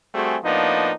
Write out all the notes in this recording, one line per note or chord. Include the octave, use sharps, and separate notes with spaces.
G3 A3 C4 F#4 G#4
A2 F3 A#3 B3 D4 D#4